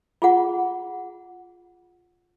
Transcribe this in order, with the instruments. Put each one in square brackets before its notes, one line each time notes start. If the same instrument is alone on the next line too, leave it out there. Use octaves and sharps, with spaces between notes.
[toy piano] F4 G#4 F#5